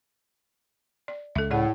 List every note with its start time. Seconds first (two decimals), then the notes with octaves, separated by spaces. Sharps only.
1.08 D5
1.35 C#2 A4 E5
1.51 A2 G#4 D5 F#5